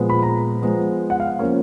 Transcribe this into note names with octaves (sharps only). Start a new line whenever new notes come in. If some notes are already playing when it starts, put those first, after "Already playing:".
Already playing: A#2 F3 G#3 B3
B5
A#5
F3 G#3 B3
F#5
F5
F3 A#3 C#4